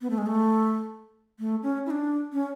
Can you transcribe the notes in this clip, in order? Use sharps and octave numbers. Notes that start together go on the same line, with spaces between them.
B3
A3
G#3
A3
A3
C#4
E4
D4
C#4